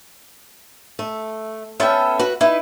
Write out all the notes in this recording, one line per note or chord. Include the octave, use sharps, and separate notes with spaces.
A3
B3 C#4 A4 E5 G5
F#4 B4
D#4 E4 B4